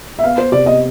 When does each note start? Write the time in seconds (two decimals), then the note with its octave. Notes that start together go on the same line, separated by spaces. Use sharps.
0.19 E5
0.24 B3 F5
0.38 C5
0.52 C3 D5
0.66 D#5